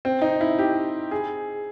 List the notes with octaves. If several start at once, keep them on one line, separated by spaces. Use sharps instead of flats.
C4
D#4
E4
G4
G#4